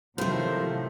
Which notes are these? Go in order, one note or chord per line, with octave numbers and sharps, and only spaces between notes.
A2 C3 D#3 F3 F#3 A3 C5